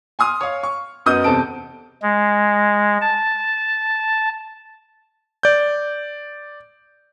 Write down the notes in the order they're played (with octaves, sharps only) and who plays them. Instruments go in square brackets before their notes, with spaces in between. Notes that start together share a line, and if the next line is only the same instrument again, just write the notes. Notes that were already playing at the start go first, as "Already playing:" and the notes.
[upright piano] G#5 C6 D#6 F6
C#5 F5
C#6
F#2 B3 D#5 D#6 G6 D#7
E2 C3 C4 A4 A5 D7
[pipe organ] G#3
A5
[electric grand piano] D5 G6